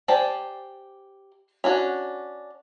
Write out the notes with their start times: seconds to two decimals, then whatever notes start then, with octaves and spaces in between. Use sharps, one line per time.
0.08 G4 C5 D5 G#5 A5
1.64 C#4 D4 F#4